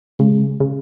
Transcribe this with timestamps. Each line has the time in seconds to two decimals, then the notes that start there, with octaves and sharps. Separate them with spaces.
0.20 C#3 G#3
0.60 C#3